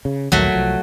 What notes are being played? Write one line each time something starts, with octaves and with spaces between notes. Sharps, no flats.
C#3
A#1 D#2 F#3 A3
C2 F3